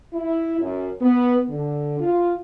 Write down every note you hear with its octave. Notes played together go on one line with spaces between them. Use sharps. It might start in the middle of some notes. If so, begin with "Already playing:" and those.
E4
F#2
B3
D3
F4